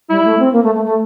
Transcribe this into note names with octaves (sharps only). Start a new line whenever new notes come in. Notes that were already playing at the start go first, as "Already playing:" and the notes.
G3 E4
A3
C4
A#3
A3
A3
A3